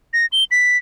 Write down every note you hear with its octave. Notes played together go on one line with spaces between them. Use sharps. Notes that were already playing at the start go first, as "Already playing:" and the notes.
A#6
G7
B6